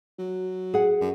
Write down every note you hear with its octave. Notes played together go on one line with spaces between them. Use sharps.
F#3
G#4 F#5
F#2